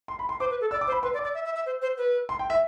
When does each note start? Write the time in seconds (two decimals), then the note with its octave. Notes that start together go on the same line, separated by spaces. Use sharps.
0.08 C6
0.19 B5
0.29 C6
0.40 C5 D6
0.50 B4
0.61 A4
0.71 D5 E6
0.81 D6
0.87 C5
0.92 B5
1.03 B4 C6
1.14 D5
1.19 D6
1.24 D5
1.35 E5
1.45 E5
1.55 E5
1.66 C5
1.82 C5
1.98 B4
2.29 C6
2.39 G5
2.50 E5